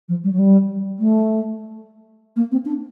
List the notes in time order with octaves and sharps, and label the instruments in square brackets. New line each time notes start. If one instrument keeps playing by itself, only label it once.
[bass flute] F3
G3
F#3
G3
A3
A#3
C4
D4